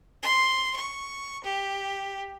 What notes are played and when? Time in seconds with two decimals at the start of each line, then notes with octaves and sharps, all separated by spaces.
0.23 C6
0.76 C#6
1.45 G4